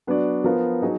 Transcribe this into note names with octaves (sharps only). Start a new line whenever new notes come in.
F#3 B3 D4 F#4 D5
F3 B3 F4 A#4
F#3 D#4 G#4